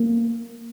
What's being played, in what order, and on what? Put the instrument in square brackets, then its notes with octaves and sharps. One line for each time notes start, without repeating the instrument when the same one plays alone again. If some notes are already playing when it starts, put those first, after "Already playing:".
Already playing: [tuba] A#3